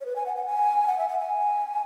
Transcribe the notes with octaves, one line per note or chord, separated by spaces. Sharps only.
C#5
B4
G#5
F#5
F#5
G#5
F#5
E5
F#5
G#5